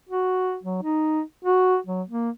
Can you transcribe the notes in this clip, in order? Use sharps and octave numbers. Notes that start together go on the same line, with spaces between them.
F#4
F#3
D#4
F#4
F#3
A#3